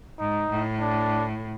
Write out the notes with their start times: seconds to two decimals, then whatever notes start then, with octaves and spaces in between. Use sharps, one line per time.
0.19 G#2 D#4
0.50 A2
0.81 D4